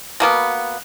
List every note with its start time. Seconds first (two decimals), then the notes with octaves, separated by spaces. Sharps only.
0.20 B2 A#3 B3